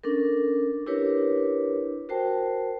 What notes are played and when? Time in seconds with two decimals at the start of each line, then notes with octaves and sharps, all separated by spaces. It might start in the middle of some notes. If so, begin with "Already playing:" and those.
0.04 C#4 D4 A4 A#4
0.87 D4 E4 G4 A#4 B4 C#5
2.09 F#4 A#4 C5 G5 A5